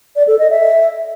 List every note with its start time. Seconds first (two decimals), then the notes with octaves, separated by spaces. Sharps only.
0.16 D5
0.27 A4
0.39 D#5
0.50 E5